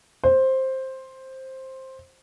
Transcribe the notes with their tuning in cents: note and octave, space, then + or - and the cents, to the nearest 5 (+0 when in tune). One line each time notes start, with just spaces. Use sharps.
C5 +10